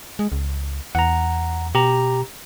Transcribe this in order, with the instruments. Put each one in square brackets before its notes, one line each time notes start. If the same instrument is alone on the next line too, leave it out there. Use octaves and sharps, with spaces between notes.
[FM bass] G#3
C#2
[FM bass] E2 [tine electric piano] F#5 A#5
[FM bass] B2 [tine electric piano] G4 A#5